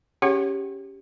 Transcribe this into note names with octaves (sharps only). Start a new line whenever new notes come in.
C#4 G4 G#4 C#5 F#5